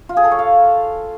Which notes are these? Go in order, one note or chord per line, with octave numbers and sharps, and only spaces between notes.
F4
G#4
A4
C#5
F5